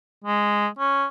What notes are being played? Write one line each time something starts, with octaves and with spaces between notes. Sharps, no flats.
G#3
C#4